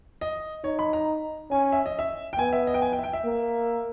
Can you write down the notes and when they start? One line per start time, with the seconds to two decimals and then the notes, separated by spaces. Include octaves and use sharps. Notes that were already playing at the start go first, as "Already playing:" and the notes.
0.21 D#5
0.64 D#4 C#5
0.79 B5
0.93 A#5
1.51 C#4 G#5
1.72 E5
1.86 D#5
1.99 E5
2.33 G5
2.38 B3 G#5
2.53 E5
2.67 D#5
2.74 G5
2.82 G#5
2.92 G5
2.99 E5
3.03 G5
3.13 E5
3.25 A#3